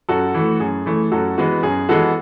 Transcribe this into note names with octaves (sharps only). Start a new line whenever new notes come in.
F#2 F#4 A4
E3 A3
F#2 G#4
E3 A3
F#2 F#4 A4
E3 G#3 B3 F#4
F#2 G#4
E3 G#3 B3 F#4 A4